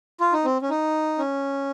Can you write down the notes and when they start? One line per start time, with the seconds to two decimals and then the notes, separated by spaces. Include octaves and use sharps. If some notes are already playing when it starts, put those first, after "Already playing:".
0.20 F4
0.33 D#4
0.45 C4
0.62 C#4
0.70 D#4
1.18 C#4